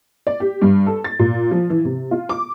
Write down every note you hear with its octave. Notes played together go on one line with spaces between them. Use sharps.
D5
G4
G2
A4
A6
A#2
F3
E3
C3
F4
D6